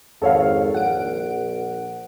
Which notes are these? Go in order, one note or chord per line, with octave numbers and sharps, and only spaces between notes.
G#1 F2 A4 C#5 F5
A#1 F#5 D7